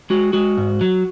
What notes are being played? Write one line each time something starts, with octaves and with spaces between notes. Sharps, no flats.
G#3 F#4
G#3 F#4
G#2
F#3